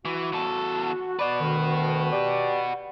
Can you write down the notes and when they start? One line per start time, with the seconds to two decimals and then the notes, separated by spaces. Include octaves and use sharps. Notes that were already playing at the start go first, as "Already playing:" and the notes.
0.05 E3 F#4
0.32 E2 A4
1.19 F#4 B4 D5
1.40 D2 D#3
2.13 G4 D5